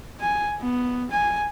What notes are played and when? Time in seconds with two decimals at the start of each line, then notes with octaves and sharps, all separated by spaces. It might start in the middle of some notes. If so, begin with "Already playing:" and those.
0.20 G#5
0.61 B3
1.11 G#5